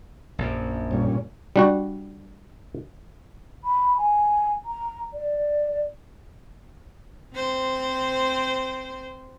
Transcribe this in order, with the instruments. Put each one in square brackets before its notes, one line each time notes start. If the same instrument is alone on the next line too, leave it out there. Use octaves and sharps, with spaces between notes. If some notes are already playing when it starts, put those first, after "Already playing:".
[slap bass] A#1 F#2
[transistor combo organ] G2 A#2 C#4
[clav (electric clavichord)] G3 D4 F#4
[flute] B5
G#5
A#5
D5
[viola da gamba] C4 C5